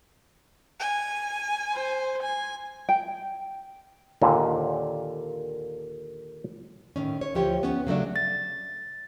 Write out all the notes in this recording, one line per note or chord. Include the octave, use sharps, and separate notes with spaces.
G#5
C5
G#5
G5
D#2 A#2 D3
A2 D#3 C#4
C#5
D2 F3 G4 C#5
B3 C#4
C#3 F#3 A3 D4
A6